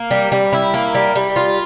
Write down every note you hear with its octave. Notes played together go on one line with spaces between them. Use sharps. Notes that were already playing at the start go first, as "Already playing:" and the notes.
Already playing: A#3
G3
G3
E4
A#3
G3
G3
F4